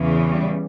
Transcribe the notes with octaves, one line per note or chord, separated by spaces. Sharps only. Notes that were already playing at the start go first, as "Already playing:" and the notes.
Already playing: E2 C#3 E3
G3